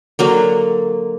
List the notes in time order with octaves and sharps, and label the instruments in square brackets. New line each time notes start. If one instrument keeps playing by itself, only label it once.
[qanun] D3 F#3 A#3